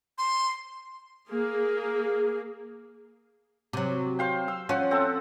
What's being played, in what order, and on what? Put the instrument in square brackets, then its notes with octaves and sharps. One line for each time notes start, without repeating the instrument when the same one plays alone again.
[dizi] C6
[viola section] A#3 G#4
[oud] C3 F#3
[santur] C5 F5 G5
E6
[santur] F3 F#5 [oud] C#4
[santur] C4 A4